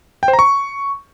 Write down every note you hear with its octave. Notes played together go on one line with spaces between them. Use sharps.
G5
C5
A#5
C#6